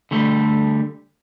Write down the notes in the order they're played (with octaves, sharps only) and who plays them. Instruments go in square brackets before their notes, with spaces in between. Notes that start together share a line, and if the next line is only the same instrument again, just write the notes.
[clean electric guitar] D3 G3 A3